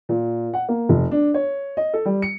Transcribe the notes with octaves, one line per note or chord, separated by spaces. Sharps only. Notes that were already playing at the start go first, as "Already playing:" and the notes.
A#2
F#5
A#3
F1
D4
C#5
D#5
A4
G3
C#7